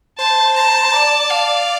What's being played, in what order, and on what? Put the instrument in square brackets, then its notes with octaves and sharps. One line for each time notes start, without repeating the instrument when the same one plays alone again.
[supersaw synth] C5 [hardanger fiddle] A5
[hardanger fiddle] A5 [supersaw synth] A#5
[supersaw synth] D5
[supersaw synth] D5 [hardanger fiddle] F5